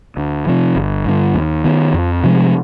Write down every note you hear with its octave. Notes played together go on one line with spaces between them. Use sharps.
D2
C3 F3
G1
G2 D3
D#2
D#3 B3
F2
C3 F3 G#3